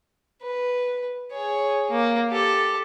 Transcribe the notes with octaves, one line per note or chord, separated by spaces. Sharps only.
B4
G#4 C#5
A#3
G4 A4